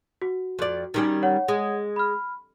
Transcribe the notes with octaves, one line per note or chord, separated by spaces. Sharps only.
F#4
F2 D5
D#3 G3 C#4
C#5 F#5
G#3
B5 F6